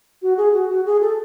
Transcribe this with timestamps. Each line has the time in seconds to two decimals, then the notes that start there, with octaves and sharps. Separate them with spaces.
0.22 F#4
0.37 G#4
0.53 F#4
0.69 F#4
0.86 G#4
1.01 A4